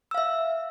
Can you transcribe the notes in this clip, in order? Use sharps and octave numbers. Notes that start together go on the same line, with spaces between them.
E5 F5 E6